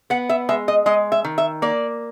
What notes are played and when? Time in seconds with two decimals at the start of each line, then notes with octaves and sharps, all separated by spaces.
0.10 B3 F#5
0.29 E5
0.49 G#3 E5
0.68 D#5
0.86 G#3 D#5
1.12 E5
1.25 D#3
1.38 E5
1.62 A#3 D5